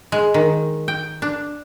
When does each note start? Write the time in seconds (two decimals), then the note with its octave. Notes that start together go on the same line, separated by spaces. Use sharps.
0.12 G#3
0.34 D#3
0.88 G5
1.22 D4